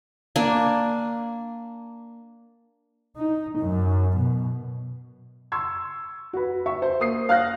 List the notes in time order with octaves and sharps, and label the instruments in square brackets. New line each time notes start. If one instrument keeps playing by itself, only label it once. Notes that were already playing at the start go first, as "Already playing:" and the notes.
[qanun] A#3 D4 G#5
[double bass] D#4
F#2
B2
[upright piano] C6 C#6 E6 G#6
F#4 B4
E5 C#6
C5
A#3 D#6 C7
F5 F6 F#6 A#6